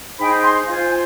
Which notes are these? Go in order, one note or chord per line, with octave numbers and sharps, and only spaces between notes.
D#4 G#4 C5 G5 B5
G#5 C6
F4 C5 F5 G#5
G#5